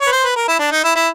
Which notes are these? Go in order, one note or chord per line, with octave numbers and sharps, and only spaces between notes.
C#5
B4
C5
B4
A#4
E4
D4
D#4
E4
E4